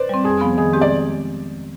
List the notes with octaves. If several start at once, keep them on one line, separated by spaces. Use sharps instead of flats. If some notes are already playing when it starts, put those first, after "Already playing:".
Already playing: B4 C5 D5
G3 C4
F2 G#4
C3 F3 B3
D#3 G#4
G#3 C4 G4
D5